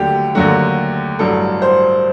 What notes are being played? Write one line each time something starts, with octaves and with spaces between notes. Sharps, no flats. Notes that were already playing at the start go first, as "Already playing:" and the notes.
Already playing: D#2 D3 F#3 A3 G4
D#2 D3 F#3 A3 F#4
A1 G2 F#3 A4
C5